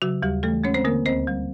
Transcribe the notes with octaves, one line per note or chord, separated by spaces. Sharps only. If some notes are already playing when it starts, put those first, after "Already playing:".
C#3 F#3 F#4
D#2 G3 G4
E3 A3 A4
G#3 C#4 C#5
C4 C5
D3 A#3 A#4
D2 C4 C5
G3